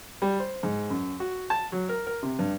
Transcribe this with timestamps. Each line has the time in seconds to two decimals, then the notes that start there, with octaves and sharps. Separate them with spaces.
0.22 G3
0.39 C5
0.63 G#2
0.90 F#2
1.20 F#4
1.50 A5
1.72 F#3
1.89 A#4
2.07 A#4
2.23 C3
2.39 G2